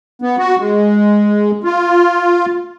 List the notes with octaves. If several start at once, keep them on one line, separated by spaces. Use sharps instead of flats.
B3
F#4
G#3
F4